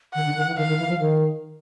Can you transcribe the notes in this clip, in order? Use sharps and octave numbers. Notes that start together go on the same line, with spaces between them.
D#3 F#5
D3
D#3
E3
D#3 F5
D#3
E3
F3
D#3